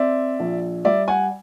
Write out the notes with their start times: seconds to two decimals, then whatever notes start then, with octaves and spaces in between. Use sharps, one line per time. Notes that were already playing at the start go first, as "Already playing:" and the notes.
Already playing: C4 D5 E5
0.40 A#1
0.85 G3 D5 E5
1.08 F#5 G#5